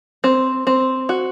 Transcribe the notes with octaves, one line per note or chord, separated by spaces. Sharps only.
C4
C4
F#4